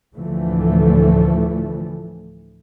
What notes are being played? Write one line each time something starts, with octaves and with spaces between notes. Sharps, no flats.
D2 A2 D3 E3 F3 A3